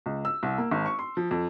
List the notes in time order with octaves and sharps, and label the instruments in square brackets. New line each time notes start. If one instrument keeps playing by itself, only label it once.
[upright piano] C#2
E6
C2
A#3
G#1
C#6
C6
F3
F2